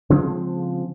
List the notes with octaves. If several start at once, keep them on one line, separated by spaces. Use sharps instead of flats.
C#3 F3 G#3 C4